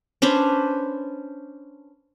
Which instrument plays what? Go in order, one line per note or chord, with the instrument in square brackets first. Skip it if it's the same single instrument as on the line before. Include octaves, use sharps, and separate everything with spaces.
[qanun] C#4 D4 B4 C5